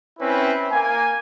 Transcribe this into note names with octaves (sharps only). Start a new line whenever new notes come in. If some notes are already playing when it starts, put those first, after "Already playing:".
C4 C#4 E4 B4
A#3 G#5